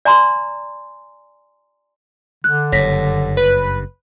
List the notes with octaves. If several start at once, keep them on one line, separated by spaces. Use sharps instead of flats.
D5 G#5 A#5 C6
D3 F#6
F#1 G2 C#5 A#6 B6
B4